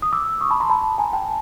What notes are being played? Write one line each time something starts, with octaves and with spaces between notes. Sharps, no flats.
D#6
D6 E6
C#6 D#6
A5 B5
A#5 C6
A5 B5
G#5 A#5
G5 A5